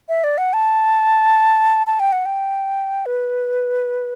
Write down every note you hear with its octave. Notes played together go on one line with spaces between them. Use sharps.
E5
D5
F#5
A5
A5
G5
F#5
G5
B4